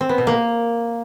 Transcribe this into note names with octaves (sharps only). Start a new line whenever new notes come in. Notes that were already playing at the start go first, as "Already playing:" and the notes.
C4
B3
B2
A#3